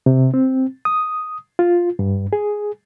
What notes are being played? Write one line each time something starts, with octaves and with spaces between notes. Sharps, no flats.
C3
C4
D#6
F4
G2
G#4